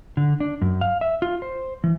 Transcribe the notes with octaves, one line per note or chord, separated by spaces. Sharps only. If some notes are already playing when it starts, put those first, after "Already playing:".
D3
D4
F#2
F5
E5
F4
C5
E3